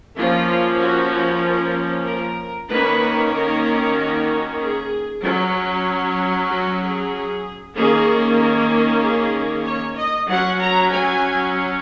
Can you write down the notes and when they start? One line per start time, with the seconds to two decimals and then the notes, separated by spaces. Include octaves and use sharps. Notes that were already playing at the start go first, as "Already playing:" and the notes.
0.17 F3 A#3 C#4 F4
0.81 F#4
1.43 A#4
2.06 A#4
2.70 D#3 A#3 C#4 B4
3.33 A#4
3.96 F#4
4.59 G#4
5.22 F#3 C#4
6.48 F#4
6.81 G#4
7.75 D#3 A#3 C#4 G#4
8.38 A#4
9.01 G#4
9.65 C#5
9.96 D#5
10.28 F#3 C#4 F#5
10.60 A#5
10.92 G#5